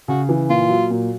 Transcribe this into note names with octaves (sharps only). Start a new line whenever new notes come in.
C#3 F#4
E3
A#2 F4
F#3
A#2